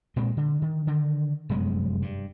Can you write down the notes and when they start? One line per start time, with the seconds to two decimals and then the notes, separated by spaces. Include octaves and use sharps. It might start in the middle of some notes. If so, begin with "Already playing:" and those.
0.16 A#2 G#3 C4
0.37 D3
0.62 D#3
0.87 D3 D#3
1.49 F1 F#2 G#3 B3
2.02 G2